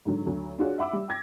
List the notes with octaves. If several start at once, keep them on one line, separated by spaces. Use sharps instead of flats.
G#2 D3 F#3
D2 F#3
D4 F4 F#4 G#4 C#5
E5 F#5 B5 D6 E6
G3
G5 D6 G#6 A#6